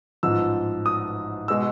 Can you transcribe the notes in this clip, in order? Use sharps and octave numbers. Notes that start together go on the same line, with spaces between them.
A1 G#2 F3 E6
D#6
B2 G#3 E6